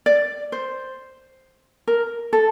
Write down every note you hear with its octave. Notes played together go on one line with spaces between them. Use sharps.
D5
C5
A#4
A4